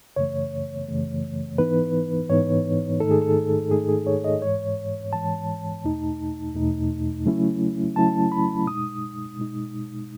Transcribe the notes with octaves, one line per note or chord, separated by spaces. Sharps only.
F#2 C#3 E3 A3 C#5
F#2 C#3 E3 A3
G#2 E3 B3 D#4 B4
G#2 E3 B3 D#4 C#5
G#2 D#3 A3 D#4 A4
G#4
A4
G#2 D#3 A3 D#4 G#4
G#4
C#5
D#5
G#2 E3 G#3 C#5
G#2 E3 G#3 A5
E2 B2 A3 D#4
E2 B2 A3 D#4
C#3 F#3 A3 C#4 E4
C#3 F#3 A3 C#4 E4 A5
B5
B2 G#3 D#4 D#6
B2 G#3 D#4